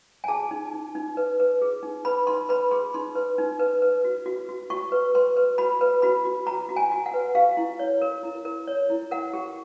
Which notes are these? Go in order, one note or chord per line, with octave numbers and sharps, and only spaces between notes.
G#5
G#4 A5
D#4
D#4
D#4
B4
B4
G#4
D#4
B4 B5
D#4 C6
B4 B5
G#4 C6
D#4 C6
B4
D#4
B4
B4
F#4
F#4
F#4
F#4 C#6
B4
B4 C6
B4
F#4 B5
B4
F#4 B5
F#4
F#4 A#5
F#4
G#5
F#4
F#5
B4
G4 F5
E4
C#5
A#4
E4
A#4
C#5
E4
A#4 F#5
G4